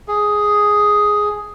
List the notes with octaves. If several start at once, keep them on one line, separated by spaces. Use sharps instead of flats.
G#4